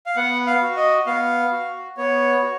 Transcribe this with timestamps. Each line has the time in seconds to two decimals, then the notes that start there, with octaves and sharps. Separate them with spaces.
0.06 F5
0.16 B3 F#5
0.47 F5
0.62 F#4
0.76 D#5
1.06 B3 F5
1.52 F#4
1.97 B3 C#5
2.42 F#4